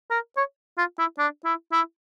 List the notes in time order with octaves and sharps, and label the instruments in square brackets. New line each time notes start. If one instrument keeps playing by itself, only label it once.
[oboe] A#4
C#5
F4
E4
D4
E4
E4